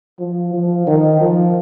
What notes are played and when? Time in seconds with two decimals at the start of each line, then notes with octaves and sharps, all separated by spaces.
0.19 F3
0.54 F3
0.87 D#3
1.21 F3